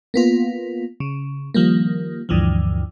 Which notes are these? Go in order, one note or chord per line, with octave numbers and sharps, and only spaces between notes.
A#3 B3 F4
C#3
D#3 F3 G3 A#3
D2 G2 D3 E3 F3